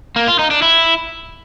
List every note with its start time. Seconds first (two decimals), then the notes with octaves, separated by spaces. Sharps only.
0.16 A#3
0.28 F4
0.39 D#4
0.51 D4
0.62 E4